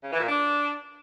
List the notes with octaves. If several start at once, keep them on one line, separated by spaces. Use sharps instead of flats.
C#3
E3
A#2
D4